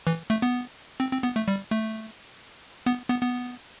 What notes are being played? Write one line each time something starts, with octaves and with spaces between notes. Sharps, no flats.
E3
A3
B3
C4
C4
B3
A3
G3
A3
B3
B3
B3